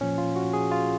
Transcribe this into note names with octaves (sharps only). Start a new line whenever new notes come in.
A#2 F3 C#4
F4
F#4
G#4
F4